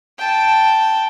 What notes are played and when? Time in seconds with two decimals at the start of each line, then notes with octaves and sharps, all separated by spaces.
0.18 G5 A5